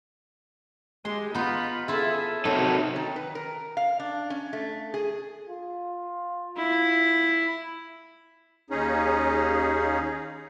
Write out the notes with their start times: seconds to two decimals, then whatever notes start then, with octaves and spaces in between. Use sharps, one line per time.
1.05 G#3 G4 C6
1.34 B3 D#4 F4 B5
1.88 E4 F4 G#4 A4 E5
2.45 C3 D#4 F#4 A4 A#4 C#5
2.96 D#3
3.16 B4
3.35 A#4
3.77 F5
4.00 D4
4.30 C#4
4.53 A3
4.94 G#4
5.49 F4
6.57 E4
8.70 D#2 C#4 D#4 G#4